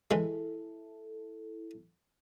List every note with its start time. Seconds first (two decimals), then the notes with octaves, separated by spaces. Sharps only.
0.11 E3 G#3 E4 A4